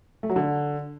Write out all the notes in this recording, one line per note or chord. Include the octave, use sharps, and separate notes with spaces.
A3
F#3
D3